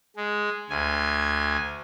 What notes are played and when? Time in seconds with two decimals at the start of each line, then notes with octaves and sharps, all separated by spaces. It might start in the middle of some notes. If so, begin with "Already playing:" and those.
0.16 G#3
0.70 D2 G#5